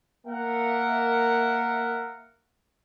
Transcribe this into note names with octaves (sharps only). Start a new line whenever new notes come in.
A#3 A#4 E5 F#5